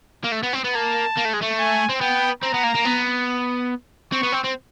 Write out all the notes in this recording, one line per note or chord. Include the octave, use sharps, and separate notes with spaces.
A#3
A3
B3
C4
B3
A#3 A5
A#3
A3
G#3
A3
G#5
C4
B3 G5
C4 A#5
B3
A#3
A#3
B3
C4 C#6
B3
C4
C4